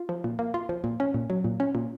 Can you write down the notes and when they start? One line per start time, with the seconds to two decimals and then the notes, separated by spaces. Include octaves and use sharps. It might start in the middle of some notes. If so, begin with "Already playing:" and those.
Already playing: F4
0.09 F3
0.24 A#2
0.39 A#3
0.54 F4
0.69 F3
0.84 A#2
1.00 C#4
1.14 A#2
1.30 F#3
1.44 A#2
1.60 C#4
1.75 A#2